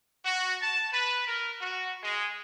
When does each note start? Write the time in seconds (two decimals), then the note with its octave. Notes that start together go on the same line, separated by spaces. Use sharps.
0.25 F#4
0.62 A5
0.92 B4
1.27 A#4
1.61 F#4
2.02 G#3